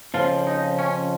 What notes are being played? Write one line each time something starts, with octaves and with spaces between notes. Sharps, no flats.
F2 C#3 F3 F4
D#4
C#4